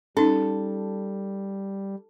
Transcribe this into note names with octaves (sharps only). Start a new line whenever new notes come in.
G3 C#4 D#4 A4